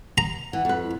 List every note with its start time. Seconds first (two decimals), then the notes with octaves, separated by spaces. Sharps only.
0.18 A#5
0.53 E3 F#5
0.65 F2 B4
0.84 E4